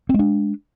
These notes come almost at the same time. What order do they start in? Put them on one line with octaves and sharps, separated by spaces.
C4 G#3 D4